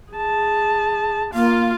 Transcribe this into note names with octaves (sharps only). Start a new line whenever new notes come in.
G#4 A5
A#3 F4 F5